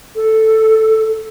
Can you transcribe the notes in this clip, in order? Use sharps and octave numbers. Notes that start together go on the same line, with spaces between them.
A4